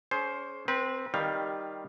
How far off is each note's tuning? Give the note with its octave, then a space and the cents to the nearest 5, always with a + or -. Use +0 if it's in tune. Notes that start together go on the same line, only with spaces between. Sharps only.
C#4 +30 G#4 +35 C5 +5
C4 +0 B4 -30
D#3 +0 G3 +5 F5 +0